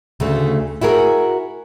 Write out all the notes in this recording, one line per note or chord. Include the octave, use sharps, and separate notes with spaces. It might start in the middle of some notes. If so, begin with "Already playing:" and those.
D2 C#3 A3
E4 F#4 G#4 A#4